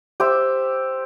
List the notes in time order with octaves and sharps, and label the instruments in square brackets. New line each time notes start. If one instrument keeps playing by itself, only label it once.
[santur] G4 C5 E5